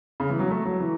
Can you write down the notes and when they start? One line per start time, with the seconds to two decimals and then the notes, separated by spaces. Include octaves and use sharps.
0.20 C#3
0.30 E3
0.39 F#3
0.51 A3
0.65 F#3
0.80 E3